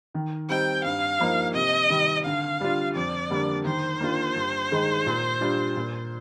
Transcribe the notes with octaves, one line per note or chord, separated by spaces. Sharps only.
D#3
G3 C4 D#4 G5
G2 F5
F3 A#3 D#4
C3 D#5
D#3 G3
D3 F5
G3 D4 F4
F2 D5
D3 G3 A#3 D4
D#3 C5
A#3 D4 F4
G2
D#3 G#3 D#4
A#2
G3 D4 F4
A#2